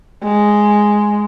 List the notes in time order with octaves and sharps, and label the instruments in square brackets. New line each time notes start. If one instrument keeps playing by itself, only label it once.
[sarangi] G#3